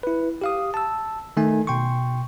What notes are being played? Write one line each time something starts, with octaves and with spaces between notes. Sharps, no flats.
E4 B4
G4 F5 D#6
A5 E6
D#3 A3 D#4 G#5
B2 G5 C6 C#6